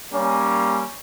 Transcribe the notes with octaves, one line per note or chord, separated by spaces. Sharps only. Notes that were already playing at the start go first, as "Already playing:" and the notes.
G3 A#3 C#4